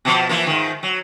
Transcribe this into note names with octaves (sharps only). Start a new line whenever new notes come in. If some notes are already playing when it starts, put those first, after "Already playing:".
B2 F3
E3 F3 A#3
G#2 D#3
F#3